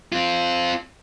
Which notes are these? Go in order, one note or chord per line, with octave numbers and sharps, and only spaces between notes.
C4 F4